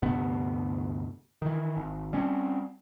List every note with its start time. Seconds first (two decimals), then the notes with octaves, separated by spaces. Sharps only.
0.02 D2 G2 C3 B3
1.42 D#3 E3
1.77 G#1
2.13 G3 C4 C#4